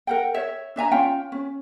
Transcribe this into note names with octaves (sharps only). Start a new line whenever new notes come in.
A#4 F#5 G5
C#5 E5
D4 E5 G#5 A#5
C#4 F4 G5
C#4